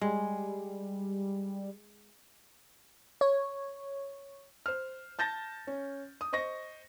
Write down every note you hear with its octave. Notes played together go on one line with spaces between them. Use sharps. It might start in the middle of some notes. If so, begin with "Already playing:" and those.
G3 G#3
C#5
C5 F6
A5 G6 A6 A#6
C#4
D#6
C5 D#5 C#6 A#6